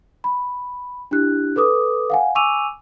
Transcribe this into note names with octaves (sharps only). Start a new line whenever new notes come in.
B5
D4 E4 G4 F#6
A4 B4 D6 D#6
F5 F#5 G#5
G#5 C#6 D6 E6 D#7 F7